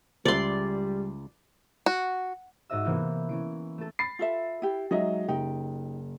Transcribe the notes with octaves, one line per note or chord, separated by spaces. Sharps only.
C#2 G3 D5 E5 C6
F#4
G#2 F#4 D#5 E5 E6
C3 E3 A#3 B3 E4 G6
E3 C#4 D7
A3 A4
B5 A6 C7
F4 A4 E5
E4 G4
F#3 G#3 D#4 D#5 E5
F#1 D#4 G4 G5